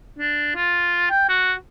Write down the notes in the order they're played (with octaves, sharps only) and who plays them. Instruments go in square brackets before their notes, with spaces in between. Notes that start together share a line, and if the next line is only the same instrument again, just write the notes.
[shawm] D4
F4
G5
F#4